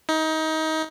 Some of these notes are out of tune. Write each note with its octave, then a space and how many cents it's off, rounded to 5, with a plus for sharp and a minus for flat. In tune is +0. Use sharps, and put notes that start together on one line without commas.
D#4 +25